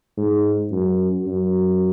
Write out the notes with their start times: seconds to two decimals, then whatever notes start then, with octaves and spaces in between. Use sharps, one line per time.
0.18 G#2
0.72 F#2
1.27 F#2